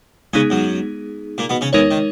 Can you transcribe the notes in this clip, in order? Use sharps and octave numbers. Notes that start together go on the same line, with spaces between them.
C#3 G#3 B3 C#4 D#4 G#4
F#2 F#3
A#2 A#3
B2 B3
C#3 C#4
E2 E3 G#3 D#4 A#4 C#5
D#3